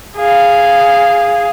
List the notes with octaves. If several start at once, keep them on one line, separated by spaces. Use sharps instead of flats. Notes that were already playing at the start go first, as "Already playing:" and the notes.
G#4 F5